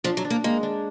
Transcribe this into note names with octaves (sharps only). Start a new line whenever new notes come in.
F3 D4
F#3
D4
A#3
G#3 A#3
D4